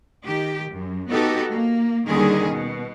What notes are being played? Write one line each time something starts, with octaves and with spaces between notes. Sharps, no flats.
D#3 G4
F#2
B3 D#4 F#4 G4 A4
A#3
D#2 D3 D#3 G3 C#4 G#4
B2